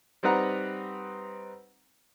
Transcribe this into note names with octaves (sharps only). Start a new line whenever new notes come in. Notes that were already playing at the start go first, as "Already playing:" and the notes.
G3 C4 D#4 B4 F#5 A#5